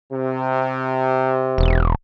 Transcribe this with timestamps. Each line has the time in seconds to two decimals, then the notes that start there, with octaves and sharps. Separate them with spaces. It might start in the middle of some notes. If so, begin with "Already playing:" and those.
0.12 C3
1.58 E1